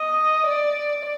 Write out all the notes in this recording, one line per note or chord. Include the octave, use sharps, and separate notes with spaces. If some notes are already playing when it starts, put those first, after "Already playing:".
Already playing: D#5
D5